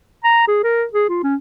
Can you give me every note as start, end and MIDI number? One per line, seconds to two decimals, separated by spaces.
0.24 0.47 82
0.48 0.58 68
0.64 0.85 70
0.93 1.06 68
1.09 1.21 65
1.23 1.36 61